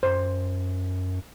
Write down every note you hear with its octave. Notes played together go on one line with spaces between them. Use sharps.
F#2 C5